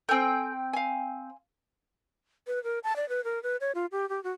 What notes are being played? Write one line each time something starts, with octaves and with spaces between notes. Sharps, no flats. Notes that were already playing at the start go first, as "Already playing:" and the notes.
C4 A4 G5 G#5
F5 G#5
B4
A#4
A5
D5
B4
A#4
B4
C#5
F4
G4
G4
F#4